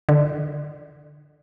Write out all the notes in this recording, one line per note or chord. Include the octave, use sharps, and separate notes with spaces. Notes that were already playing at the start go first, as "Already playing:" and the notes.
D3